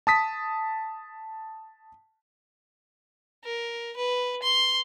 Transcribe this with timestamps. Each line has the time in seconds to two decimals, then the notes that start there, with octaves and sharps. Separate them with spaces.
0.07 A5 D#6 B6
3.44 A#4
3.96 B4
4.43 C6